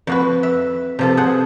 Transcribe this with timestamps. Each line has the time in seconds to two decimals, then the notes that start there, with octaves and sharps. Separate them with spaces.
0.07 F2 F#4 B4
0.43 E5
0.99 C3 F3 A4
1.17 G#4 C5 F#5